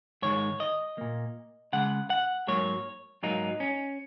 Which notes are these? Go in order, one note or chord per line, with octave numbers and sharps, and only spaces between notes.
G#2 D#3 G#3 C#5
D#5
A#2 A#3
C#3 G#3 F#5
F#5
G#2 F#3 A#3 C#5
G#2 F#3 A#3 D#4
C#4